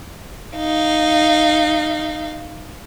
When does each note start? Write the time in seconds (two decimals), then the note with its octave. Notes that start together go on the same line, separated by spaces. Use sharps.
0.57 D#4 F5